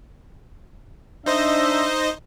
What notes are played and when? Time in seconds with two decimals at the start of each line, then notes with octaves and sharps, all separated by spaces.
1.26 D4 D#4 C5 D#5 E5